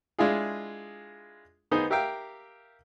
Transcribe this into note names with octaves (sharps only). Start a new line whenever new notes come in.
G#3 D4 E4 F4 G#4
D#3 B3 D#4 G#4 C5
G4 A#4 E5 F5 G5